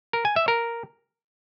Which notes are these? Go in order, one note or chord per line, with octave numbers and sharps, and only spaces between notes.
A#4
G#5
E5
A#4